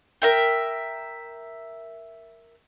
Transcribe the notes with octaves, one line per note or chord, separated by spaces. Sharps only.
A#4 E5 G5